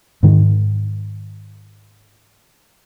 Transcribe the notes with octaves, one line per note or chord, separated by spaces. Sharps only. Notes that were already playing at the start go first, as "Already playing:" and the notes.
G#2 D#3